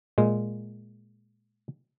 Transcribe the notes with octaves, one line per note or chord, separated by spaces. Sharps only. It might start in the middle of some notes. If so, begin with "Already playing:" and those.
A#2 G#3